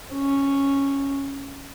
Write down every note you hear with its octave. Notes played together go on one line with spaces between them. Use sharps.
C#4